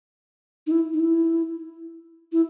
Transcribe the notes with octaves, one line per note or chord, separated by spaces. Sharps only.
D#4
E4
D#4
E4
E4